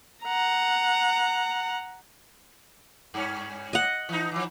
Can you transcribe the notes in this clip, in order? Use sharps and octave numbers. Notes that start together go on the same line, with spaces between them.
F#5 A#5
G2 C#4
D#5 F#5
E3 D#4
E3 F3